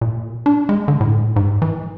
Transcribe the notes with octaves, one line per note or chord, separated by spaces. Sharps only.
A#2
D4
G#3
D3
A2
G#2
E3